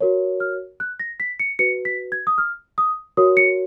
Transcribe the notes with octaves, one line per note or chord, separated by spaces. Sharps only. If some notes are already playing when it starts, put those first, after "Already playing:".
F#4 A#4 C#5
F6
F#6
A#6
B6
C#7
F#4 B4 C#7
B6
G#6
D#6
F6
D#6
F#4 A#4 C#5 D#6
C#7